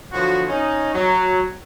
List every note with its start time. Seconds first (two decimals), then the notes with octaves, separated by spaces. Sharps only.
0.13 D3 F3 F#3 B3 F#4
0.48 C#4 D#4
0.94 F#3